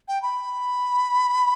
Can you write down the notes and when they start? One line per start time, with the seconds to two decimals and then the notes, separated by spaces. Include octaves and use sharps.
0.08 G5
0.22 B5